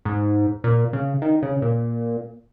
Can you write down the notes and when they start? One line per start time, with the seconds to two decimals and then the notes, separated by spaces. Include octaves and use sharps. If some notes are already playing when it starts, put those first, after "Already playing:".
0.05 G#2
0.64 A#2
0.93 C#3
1.22 D#3
1.43 C#3
1.62 A#2